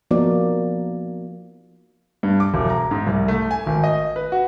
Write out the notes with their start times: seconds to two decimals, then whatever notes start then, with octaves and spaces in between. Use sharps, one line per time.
0.11 F3 A#3 B3 D#4 F#4 D5
2.23 G2
2.40 D6
2.54 E1
2.70 A#5
2.91 G#2
3.07 C2
3.28 A3
3.51 G#5
3.66 G#1
3.84 D#5
4.16 B4
4.32 F#4